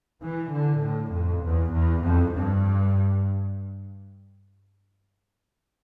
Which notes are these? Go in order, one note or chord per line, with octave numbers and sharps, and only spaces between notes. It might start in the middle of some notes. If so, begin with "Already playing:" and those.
E3
D3
A2
F2
E2
E2
F2
G2